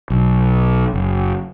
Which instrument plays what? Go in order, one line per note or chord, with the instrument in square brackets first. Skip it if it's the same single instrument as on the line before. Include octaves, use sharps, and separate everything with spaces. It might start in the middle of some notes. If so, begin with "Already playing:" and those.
[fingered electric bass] B1
F#1